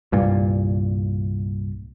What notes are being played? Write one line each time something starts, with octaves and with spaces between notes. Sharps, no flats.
C2 G2 A#2